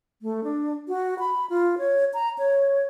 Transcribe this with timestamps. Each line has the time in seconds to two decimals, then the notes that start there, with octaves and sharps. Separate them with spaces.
0.22 A3
0.44 D4
0.88 F#4
1.19 B5
1.50 F4
1.78 C#5
2.14 A#5
2.39 C#5